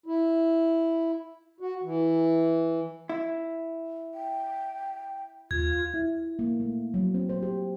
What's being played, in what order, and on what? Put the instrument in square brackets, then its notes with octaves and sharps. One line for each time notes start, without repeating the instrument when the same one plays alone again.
[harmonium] E4
F#4
E3
[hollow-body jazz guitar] E4
[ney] G5
[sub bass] D#2 [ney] F4 [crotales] G#6
[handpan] E4
A#3
A3
F#3
C4
C5
G4